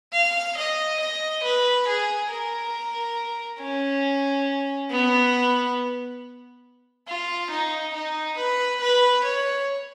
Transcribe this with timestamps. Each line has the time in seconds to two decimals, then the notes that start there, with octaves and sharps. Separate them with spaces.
0.13 F5
0.57 D#5
1.00 D#5
1.43 B4
1.88 G#4
2.30 A#4
3.60 C#4
4.91 B3
7.08 F4
7.51 D#4
7.94 D#4
8.37 B4
8.81 B4
9.24 C#5